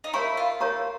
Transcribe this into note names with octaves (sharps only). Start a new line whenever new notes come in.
D#4
E4 A#4 C#5 F5 A#5 C#6
F4
A#4 C#5 F5 A#5 C#6